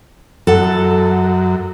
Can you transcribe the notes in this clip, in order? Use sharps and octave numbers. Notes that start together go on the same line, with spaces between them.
F#2 A4 F#5